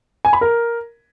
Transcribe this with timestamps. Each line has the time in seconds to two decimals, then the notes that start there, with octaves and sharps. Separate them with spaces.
0.25 G#5
0.33 B5
0.41 A#4